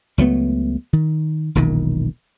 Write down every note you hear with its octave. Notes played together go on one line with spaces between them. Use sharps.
C#2 F#3 A3 B3
D#3
E1 B1 A#2 D#3